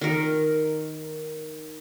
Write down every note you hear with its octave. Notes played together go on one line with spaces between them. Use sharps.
D#3 A#4